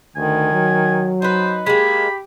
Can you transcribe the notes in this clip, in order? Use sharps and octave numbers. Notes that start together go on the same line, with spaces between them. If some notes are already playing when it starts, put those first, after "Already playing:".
D2 D#3 G#5
F#3
D#4 B4 C5
G#3 A#3 G4 B5